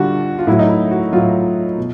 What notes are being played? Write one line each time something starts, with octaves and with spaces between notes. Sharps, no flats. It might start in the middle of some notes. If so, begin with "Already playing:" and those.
Already playing: D3 G3 F4 F#4
F4
A2 F#3 E4
D#4
E4
F#4
A2 F#3 F4
B2